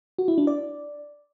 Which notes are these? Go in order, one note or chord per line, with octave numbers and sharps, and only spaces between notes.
F#4
E4
D4
D5